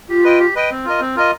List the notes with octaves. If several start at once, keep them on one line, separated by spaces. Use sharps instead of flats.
F4 G4
B4 D#5 G5
G4
B4 D#5 G5
C4
F4 A#4 D#5
C4
F4 A#4 D#5